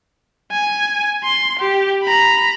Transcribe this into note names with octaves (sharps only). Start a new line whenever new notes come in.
G#5
C6
G4
A#5 B5